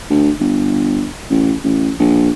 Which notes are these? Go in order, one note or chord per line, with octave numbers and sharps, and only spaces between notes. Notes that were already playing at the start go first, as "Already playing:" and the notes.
D2
G1
A1
A1
A#1